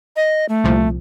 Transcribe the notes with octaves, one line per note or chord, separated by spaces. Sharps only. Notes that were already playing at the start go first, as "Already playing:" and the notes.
D#5
A3
C2 A#2 F3